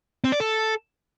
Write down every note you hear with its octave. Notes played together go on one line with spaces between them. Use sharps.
C4
D5
A4